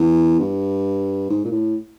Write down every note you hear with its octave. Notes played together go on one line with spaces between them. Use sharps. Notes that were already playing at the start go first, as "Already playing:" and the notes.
Already playing: E2
G2
G#2
A#2
A2